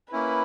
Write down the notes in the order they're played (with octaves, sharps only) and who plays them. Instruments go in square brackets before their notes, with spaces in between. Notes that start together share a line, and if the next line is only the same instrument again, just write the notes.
[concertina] A#3 C#4 E4 [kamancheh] B4